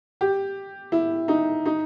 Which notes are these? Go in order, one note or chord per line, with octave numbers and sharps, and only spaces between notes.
G4
E4
D#4
D#4